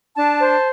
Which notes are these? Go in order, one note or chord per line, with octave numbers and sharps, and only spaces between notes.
D4 A5
C5